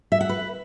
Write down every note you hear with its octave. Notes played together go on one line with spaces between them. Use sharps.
E5
F#5
B4